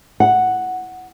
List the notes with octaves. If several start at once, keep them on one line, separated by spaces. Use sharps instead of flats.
F#5